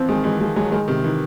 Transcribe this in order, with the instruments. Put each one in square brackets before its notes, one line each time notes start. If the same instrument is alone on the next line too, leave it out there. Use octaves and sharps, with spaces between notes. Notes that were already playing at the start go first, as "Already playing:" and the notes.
Already playing: [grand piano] E3 F3 [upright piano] C4
[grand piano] D#3 [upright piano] G#3
[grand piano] E3 [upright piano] G#3
[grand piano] F3 [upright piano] G#3
[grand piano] F#3 [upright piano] G#3
[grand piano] D#3 [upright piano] G#3
[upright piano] C3 [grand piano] D#3
[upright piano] D#3 [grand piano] E3